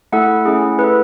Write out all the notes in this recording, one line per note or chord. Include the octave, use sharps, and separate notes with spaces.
A3 E4 A4 F#5
A3 C#4 E4 G#4
A3 E4 A4 B4